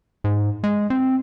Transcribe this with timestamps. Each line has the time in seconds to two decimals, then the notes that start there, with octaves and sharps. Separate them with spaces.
0.24 G#2
0.64 G#3
0.90 C4